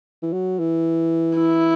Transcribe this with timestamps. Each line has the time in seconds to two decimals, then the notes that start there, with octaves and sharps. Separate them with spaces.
0.23 E3
0.33 F#3
0.59 E3
1.39 E4